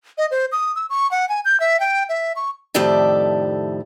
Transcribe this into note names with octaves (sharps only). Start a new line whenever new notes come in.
D#5
C5
D#6
E6
C#6
F#5
G#5
G6
E5
G5
E5
C#6
F2 A2 D#3 G4 D5 E5